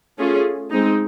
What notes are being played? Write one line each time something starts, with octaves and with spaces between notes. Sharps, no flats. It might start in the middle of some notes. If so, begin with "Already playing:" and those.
A3 C#4 F4 G#4
G#3 C4 D#4